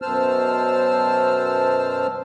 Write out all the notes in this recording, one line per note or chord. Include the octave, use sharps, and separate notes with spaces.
F#2 B2 C5 A5 E6 F6